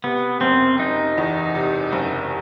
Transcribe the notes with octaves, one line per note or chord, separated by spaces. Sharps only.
C3 B3
F#1 C4
F#1 D#4
E2
C3
F#1